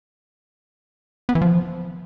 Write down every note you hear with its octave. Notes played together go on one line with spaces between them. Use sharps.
B3
E3
F3